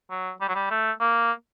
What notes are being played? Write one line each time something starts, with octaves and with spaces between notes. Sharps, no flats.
F#3
G3
F#3
G3
A3
A#3